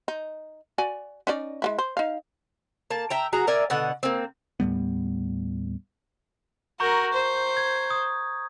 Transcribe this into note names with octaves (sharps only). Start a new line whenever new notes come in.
D#4
F#4 D5 G#5
C#4 D#4 D5
G#3 A#3 E4
C5
D#4 F5
A#3 A5
E5 G5 A#5
F#4 G#4 A#5
A#4 D5 E5 G#5
B2 D3 F#5
A#3 C4
D#2 A2 G3 B3
F#4 A#4 A#5 C#6 G6
C5
G#6
D#6